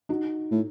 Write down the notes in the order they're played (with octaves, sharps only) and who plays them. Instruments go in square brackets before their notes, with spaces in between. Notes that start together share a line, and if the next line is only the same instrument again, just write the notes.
[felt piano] D#4 F#4
[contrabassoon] A2